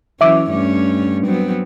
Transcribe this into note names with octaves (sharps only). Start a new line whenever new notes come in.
E3 F#3 C#4 E5 D6
G2 A3 C#4
F#3 B3 C4